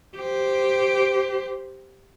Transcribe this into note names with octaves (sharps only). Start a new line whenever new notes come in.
G4 C5